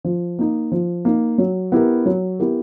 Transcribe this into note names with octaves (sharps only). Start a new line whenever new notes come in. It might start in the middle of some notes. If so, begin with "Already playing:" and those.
F3
A#3 D#4
F3
A#3 D#4
F#3
B3 E4 G4 A#4
F#3
B3 E4 G4 A#4